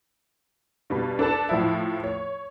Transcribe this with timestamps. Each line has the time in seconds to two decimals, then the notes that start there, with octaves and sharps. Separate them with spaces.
0.90 G2 B2 B5
1.19 D4 A4 B4 A5
1.49 A2 F3 E4
2.04 C#5